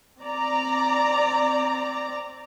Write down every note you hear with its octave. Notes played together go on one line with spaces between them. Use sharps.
C4 D5 A#5